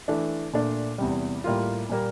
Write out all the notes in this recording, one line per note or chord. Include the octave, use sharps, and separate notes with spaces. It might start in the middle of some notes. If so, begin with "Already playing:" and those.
E3 A3 D4
A#2 A3 D4
E2 C3 G3
A2 G3 A#3 F4
A#2 G3 A#3